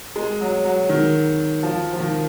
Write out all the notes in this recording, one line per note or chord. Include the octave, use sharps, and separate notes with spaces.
G#3
F#3
F#3
D#3
F3
F3
D#3